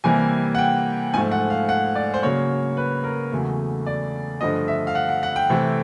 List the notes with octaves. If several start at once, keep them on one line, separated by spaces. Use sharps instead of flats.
C3 E3 G3 A#3 G#5
F#5
G5
G#2 F3 A3 G#5
F#5
F5
F#5
D5
C5
C#3 F#3 A#3 C#5
B4
A#4
E2 C#3 F#3 A3
D5
G2 D3 F3 A3 D#5
E5
F5
F#5
F#5
F#5
G5
C3 E3 A3